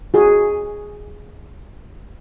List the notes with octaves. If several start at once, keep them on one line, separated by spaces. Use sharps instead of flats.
F#4 G#4